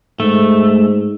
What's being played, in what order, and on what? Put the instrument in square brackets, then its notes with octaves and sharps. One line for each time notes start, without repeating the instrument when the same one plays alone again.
[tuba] G#2 [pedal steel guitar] A3